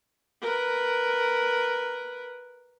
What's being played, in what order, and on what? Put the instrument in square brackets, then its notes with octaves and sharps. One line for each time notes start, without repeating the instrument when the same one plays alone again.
[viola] A#4 B4